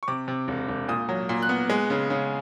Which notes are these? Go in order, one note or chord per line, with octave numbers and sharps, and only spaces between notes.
C#6
C3 D6
C3
E1
E1
A#2 D#6
F#3
A#2
F#6
B3
G#3
C#3
C#3